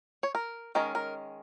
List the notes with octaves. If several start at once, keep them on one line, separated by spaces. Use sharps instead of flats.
C#5
A#4
D#3 G#3 C#4 A#4
A#4